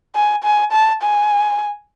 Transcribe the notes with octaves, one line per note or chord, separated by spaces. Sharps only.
G#5
G#5
A5
G#5